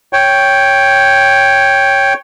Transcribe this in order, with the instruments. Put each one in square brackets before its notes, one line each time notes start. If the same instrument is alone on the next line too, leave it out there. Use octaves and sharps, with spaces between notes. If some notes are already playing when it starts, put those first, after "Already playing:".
[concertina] C#5 G5